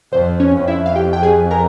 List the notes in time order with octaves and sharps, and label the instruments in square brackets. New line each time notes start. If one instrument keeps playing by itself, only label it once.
[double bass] F2 [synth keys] C5
[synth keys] C#4 C#5
[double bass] F2
[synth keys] E4 E5
F5
G4 G5
G5
G#4 G#5
A#4 A#5